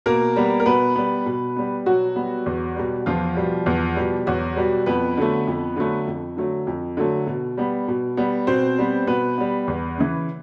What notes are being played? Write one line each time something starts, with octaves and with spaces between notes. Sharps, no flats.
B2 A#3 A#4
G3 B3
A#4
B2 B3 B4
G3 B3
B2
G3 B3
B2 F#3 F#4
G3 B3
E2
B2 G3
E2 F3 F4
B2 G3
E2
B2 G3
E2 F#3 F#4
B2 G3
F2 B3 B4
D3 F#3 A3
F2
D3 F#3 A3
F2
D3 F#3 A3
F2
D3 F#3 A3
B2
G3 B3
B2
G3 B3
B2 C4 C5
G3 B3
B2 B3 B4
G3 B3
E2
C#3 E3